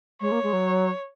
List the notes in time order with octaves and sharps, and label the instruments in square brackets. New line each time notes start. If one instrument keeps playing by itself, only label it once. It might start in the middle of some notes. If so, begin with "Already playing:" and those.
[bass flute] G#3 [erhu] C#5
[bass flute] A#3
G#3
F#3